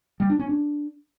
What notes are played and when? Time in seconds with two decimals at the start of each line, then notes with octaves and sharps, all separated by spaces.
0.20 G3
0.30 D4
0.39 C#4
0.49 D4